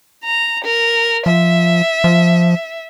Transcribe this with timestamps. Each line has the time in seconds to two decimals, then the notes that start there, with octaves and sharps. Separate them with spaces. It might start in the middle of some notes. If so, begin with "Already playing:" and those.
0.24 A#5
0.64 A#4
1.26 F3 E5
2.04 F3